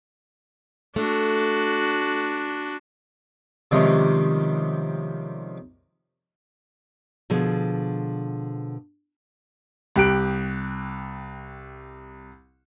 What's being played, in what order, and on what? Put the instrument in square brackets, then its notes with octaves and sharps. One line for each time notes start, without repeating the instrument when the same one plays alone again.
[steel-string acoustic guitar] A3 [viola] D4 F#4
[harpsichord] C3 D#3 F3 G3 G#3 C#4
[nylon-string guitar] B2 D3 F3 G#4
[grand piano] C2 G4 F#6 D7